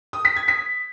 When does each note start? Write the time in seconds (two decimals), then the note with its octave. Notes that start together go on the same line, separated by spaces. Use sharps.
0.13 D#6
0.25 B6
0.36 G#6
0.48 B6